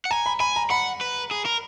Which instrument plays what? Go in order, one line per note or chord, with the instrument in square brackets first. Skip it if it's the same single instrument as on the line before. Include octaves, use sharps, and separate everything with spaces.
[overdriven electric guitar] F#5
[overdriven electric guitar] G#5 [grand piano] A#5
[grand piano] B5
[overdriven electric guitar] G#5 [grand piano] B5
[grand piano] A#5
[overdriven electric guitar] F#5 [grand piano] B5
[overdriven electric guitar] B4
G#4
A#4